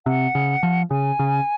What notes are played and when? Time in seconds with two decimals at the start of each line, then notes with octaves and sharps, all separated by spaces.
0.06 C3 F#5
0.35 C#3
0.63 F3
0.91 C#3 G#5
1.19 C#3